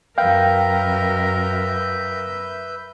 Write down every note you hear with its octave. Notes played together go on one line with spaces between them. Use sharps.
F#2 A#4 B4 E5 F5 G5 G6